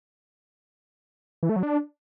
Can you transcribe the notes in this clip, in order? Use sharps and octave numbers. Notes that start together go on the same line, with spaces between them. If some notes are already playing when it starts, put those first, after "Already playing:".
E3
A3
F#3
D4